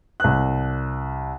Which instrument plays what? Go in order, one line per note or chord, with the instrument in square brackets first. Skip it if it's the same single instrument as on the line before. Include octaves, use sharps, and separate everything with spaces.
[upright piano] C2 F#6